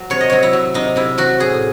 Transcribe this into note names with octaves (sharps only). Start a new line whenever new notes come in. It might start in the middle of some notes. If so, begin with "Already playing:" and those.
Already playing: F#3
C3 C#5
D#5
F#3 C#5
E4
F#3
C3 D#4
C3 E4
F#3 F#4
A2 G#4